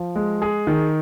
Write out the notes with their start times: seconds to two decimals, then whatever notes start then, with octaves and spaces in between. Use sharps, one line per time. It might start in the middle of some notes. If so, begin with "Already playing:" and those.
Already playing: F3
0.15 G#3
0.42 G#4
0.67 D#3